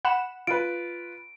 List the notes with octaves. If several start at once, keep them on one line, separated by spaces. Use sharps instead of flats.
F#5 B5 E7
F4 B4 D7